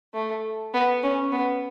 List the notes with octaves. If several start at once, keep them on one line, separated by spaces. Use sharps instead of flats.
A3
B3
C#4
B3